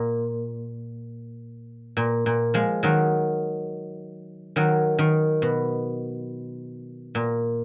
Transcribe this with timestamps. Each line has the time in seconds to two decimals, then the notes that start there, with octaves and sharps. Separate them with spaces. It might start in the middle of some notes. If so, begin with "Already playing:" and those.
Already playing: A#2
1.97 A#2
2.26 A#2
2.54 F3 G#3
2.83 D#3 F#3
4.56 D#3 F#3
4.99 D#3
5.42 B2
7.15 A#2